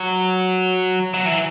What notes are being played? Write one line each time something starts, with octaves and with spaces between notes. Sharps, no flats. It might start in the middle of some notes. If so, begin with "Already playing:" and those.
Already playing: F#3
F#3
E3